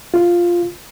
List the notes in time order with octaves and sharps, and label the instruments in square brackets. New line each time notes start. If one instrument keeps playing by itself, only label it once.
[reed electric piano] F4